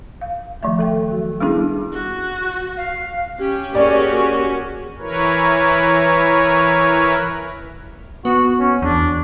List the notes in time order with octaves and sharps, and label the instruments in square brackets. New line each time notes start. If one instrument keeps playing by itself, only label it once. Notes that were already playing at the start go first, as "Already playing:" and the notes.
[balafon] F5
D#3 F3 A3 E5
A4 E5 G5
F#3 F#4
G3 B3 C#4 D4 E4 G#4
[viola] F#4
[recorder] F5
[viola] C#4 [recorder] G4
[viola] A#3 G#4 [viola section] C#4 F#4 [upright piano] D5
[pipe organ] E3 E4 A#4 B4 C#5
[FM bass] B3 [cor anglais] F#4
[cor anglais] C#4
[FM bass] E2 [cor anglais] D4